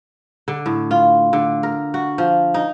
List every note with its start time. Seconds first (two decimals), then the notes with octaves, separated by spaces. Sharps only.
0.48 D3
0.66 A2
0.91 F4
1.33 D3
1.63 A#4
1.94 F#4
2.18 F3
2.54 D#4